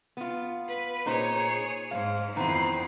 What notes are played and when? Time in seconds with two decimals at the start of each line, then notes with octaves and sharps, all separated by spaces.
0.17 B3 F4
0.68 B4
1.06 A#2 D#4 G#4 C5 C#5
1.91 G#2 C5 F5
2.36 F2 D#3 E3 B3 C4